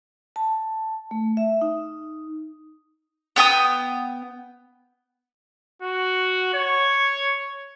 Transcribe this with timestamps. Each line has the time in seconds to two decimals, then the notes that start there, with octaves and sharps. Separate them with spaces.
0.36 A5
1.11 A3
1.37 E5
1.62 D#4
3.36 B3 G5 A5 D#6
5.82 F#4
6.54 C#5